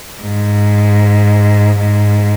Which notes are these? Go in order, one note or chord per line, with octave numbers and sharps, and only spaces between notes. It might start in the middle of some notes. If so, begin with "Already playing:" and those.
G#2
G#2